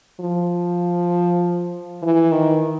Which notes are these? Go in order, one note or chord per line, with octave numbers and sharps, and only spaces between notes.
F3
E3
D#3